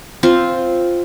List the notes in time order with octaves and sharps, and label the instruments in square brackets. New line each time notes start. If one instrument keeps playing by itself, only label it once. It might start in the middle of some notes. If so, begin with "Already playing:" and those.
[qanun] C4 F4